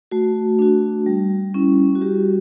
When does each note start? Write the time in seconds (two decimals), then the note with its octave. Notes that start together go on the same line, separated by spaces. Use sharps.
0.11 A3 F#4
0.59 D4 F#4
1.06 G3
1.54 C#4 E4
1.95 F#4
2.01 G3 G4